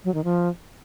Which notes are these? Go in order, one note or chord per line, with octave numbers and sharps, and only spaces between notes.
F#3
D#3
F3